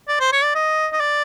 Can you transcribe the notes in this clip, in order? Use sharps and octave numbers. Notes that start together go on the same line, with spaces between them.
D5
C5
C#5
D5
D#5
D#5
D5